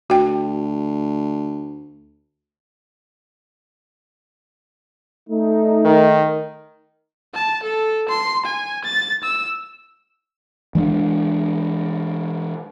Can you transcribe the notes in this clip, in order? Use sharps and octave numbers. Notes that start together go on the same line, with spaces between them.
D2 F#4 G5
A3 D#4
D#3
A5
A4
C6
G#5
A6
E6
E3 G#3 C4 D4